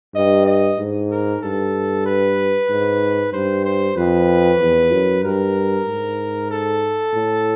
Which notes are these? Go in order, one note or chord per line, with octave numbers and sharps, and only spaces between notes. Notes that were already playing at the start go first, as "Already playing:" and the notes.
G2 D#5
D#5
G#2
A#4
G2 A4
B4
G#2
G2 C5
C5
F2 B4
E2
F#2
G2 A#4
G#2
A4
A2